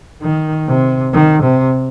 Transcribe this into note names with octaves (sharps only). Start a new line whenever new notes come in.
D#3
C3
D#3
C3